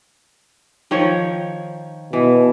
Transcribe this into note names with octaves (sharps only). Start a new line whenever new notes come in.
D#3 F3 C#5
B2 E3